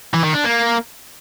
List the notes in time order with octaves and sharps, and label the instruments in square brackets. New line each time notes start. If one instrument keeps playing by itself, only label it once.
[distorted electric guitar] E3
D#3
D4
A#3